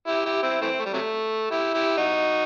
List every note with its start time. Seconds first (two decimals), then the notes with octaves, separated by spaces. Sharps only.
0.07 E4 G4
0.25 E4 G4
0.43 C4 E4
0.61 E3 A3 C4
0.79 A3
0.86 G3
0.93 C3 F#3 A3
1.50 E4 G4
1.74 E4 G4
1.97 D#4 F#4